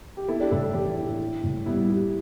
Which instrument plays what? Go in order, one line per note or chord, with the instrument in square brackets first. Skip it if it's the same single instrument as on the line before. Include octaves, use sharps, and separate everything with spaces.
[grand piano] G4
[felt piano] B3 [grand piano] E4 A4
[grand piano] D4 G4
[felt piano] A2 [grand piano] E4 A4
[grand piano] E4 A4
[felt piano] E3 [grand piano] D4 G4
[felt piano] E4
E4
A2
[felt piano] G3 [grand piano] B3 E4
[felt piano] G4